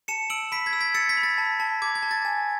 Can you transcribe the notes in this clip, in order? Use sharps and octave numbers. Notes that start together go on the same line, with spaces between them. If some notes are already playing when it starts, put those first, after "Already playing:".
A5 C#7 E7
E6 D7 F#7
B5 B6 D7
G#6 B6
E6
G#6 B6
E6 A6 C#7
G#6 B6
B5
A6
A5
A5
D6 G#6
G#6
A5
A6
G#5